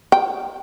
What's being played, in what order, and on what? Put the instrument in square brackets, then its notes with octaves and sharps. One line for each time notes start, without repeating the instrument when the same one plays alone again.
[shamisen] G5